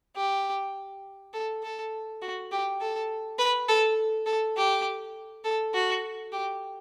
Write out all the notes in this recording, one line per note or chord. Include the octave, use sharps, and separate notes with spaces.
G4
A4
A4
F#4
G4
A4
B4
A4
A4
G4
A4
F#4
G4